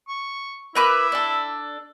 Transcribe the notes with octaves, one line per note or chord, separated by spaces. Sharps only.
C#6
E4 A#4 B4 D6
D4 A4